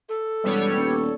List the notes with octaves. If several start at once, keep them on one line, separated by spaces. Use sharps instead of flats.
A4
E1 G3 B3 C#5
D#1